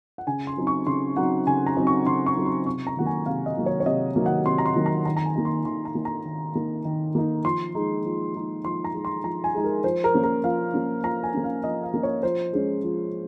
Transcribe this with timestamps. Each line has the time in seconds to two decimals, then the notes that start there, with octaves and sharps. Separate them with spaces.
0.18 F#5
0.27 C#3 G#5
0.47 C6
0.57 F#3 C4 D#4
0.67 C#6
0.87 C#3 C6
1.16 F#3 C4 D#4 F#5
1.47 C#3 G#5
1.66 A#5
1.77 F#3 C4 D#4
1.87 C#6
2.07 C#3 C6
2.26 C#6
2.37 F#3 C4 D#4
2.46 C6
2.66 C3 C#6
2.87 A#5
2.96 D#3 F#3 A#3 F#5
3.06 G#5
3.26 C3 F5
3.46 D#5
3.56 D#3 F#3 A#3
3.66 C#5
3.80 C#5
3.86 C3 D#5
4.16 D#3 F#3 A#3
4.26 F#5
4.46 C3 C6
4.58 A#5
4.66 C6
4.75 D#3 F#3 A#3
4.86 A#5
5.05 D#3 A#5
5.16 A#5
5.25 G#5
5.35 A#3 D#4
5.45 C6
5.65 D#3 C6
5.85 A#5
5.95 A#3 D#4
6.05 A#5
6.25 D#3
6.55 A#3 D#4
6.85 D#3
7.15 A#3 D#4
7.44 F3 C6
7.75 G#3 D#4
8.05 F3
8.35 G#3 D#4
8.65 F3 C6
8.84 A#5
8.94 G#3 D#4
9.05 C6
9.24 F3 A#5
9.44 G#5
9.54 G#3 D#4
9.64 A#4
9.84 F3 C5
10.04 A#4
10.14 A#3 C#4
10.24 A#4
10.44 F3 F5
10.74 A#3 C#4
11.03 F3 A#5
11.23 G#5
11.34 A#3 C#4
11.44 F5
11.64 F3 D#5
11.83 F5
11.94 A#3 C#4
12.03 C#5
12.23 F3 C5
12.53 G#3 C#4
12.83 F3